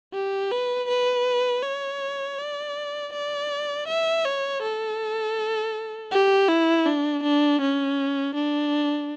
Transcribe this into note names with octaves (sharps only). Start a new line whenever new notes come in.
G4
B4
B4
C#5
D5
D5
E5
C#5
A4
G4
E4
D4
D4
C#4
D4